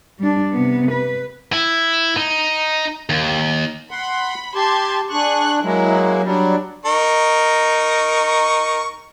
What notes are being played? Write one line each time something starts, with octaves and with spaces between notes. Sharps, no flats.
G3 D4
C3 B3
B4
E4
D#4
D#2
F#5 B5 C6
G4 A5 C6 G#6
D4 G#4 C#6 F#6
F#3 G#3 A#3 E4
F#3 G3 D4
D#4 A#4 C#6